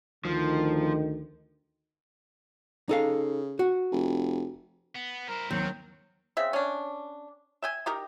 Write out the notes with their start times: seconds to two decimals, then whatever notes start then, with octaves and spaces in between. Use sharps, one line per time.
0.25 D2 D#3 F3
2.89 C#3 D#4 A4 F5
3.59 F#4
3.92 F1
4.96 B3
5.29 E4 A#4 C5
5.51 D#2 D#3 F#3 C4
6.37 C#3 C4 E5
6.53 C#4 D4
7.62 E5 G5 G#5
7.86 D#4 G4 A#4